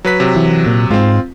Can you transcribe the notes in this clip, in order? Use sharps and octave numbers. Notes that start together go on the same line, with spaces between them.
F#3 B4 B6
C3 F#3
E3
A#2
G#2 C4 F4